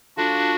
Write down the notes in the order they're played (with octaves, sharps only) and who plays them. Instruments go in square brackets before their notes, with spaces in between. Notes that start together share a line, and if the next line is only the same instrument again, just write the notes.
[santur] F3 A3 F4 A4 [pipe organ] D4 F#4